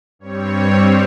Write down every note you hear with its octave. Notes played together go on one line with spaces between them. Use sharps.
G2 G3 C4 C#5
C5